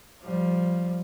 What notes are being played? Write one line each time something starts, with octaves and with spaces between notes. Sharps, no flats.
F3 G3